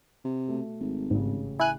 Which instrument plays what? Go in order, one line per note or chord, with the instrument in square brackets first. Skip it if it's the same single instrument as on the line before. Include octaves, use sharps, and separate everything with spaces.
[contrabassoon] C3
[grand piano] B2 A3
[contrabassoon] G#1
[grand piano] A1 C#3 [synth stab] G#2
[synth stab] E4 F#6 [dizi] G#5